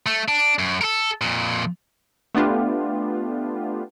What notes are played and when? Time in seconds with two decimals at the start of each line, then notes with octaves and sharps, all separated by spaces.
0.06 A3
0.28 D4
0.59 F#2
0.81 A4 A#4
1.21 F2 A#2
2.35 A3 B3 D4 F4 G4